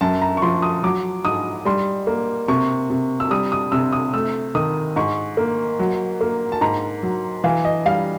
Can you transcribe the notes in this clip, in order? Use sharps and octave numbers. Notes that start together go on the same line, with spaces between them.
F#2 A5
A#5
C#6
F3 C6
D#6
F#3 D6
G#2 D#6
G3 C6
A#3
C3 C#6
C3
E6
G3 D#6
D#6
C3 E6
D#6
A3 E6
D#3 D#6
G#2 C#6
A#3
F#3
A#3
A5
G#2 A#5
F#3
E3 F5
D#5
G3 F5